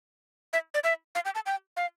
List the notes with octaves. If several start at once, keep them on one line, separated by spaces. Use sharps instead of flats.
E5
D5
E5
F5
G5
A5
G5
F5